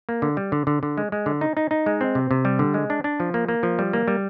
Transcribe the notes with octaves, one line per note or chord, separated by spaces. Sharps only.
A#3
D3
G3
D3
D3
D3
G#3
G#3
D3
D#4
D#4
D#4
G#3
C4
C3
C3
G3
D3
G#3
D4
D4
F3
A#3
A#3
F3
G3
A#3
G3